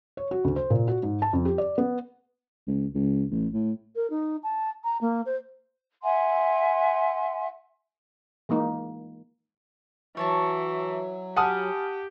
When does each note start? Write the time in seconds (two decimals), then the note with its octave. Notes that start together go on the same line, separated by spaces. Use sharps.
0.17 C#5
0.31 F#4
0.44 D2
0.56 C5
0.70 A#2
0.88 F#4
1.03 G#2
1.22 A5
1.33 F2
1.45 G4
1.58 D5
1.78 B3
2.67 C#2
2.94 C#2
3.31 A1
3.53 A2
3.95 A#4
4.10 D#4
4.43 A5
4.84 A#5
5.01 A#3
5.25 C5
6.03 E5 F#5 G#5 C6
8.49 E3 G#3 A#3 D#4
10.17 E3 F#3 C#5 A5 C#6
11.36 G4 F#5 G#5 A5 B5 D#6 F6